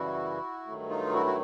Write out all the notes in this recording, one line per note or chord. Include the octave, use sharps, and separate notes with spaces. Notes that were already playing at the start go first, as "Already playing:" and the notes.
Already playing: F#2 C#3 E3 G3 E4 F#4
G2 D#3 F#3 A3
D#4 F4
E4 F#4
F#4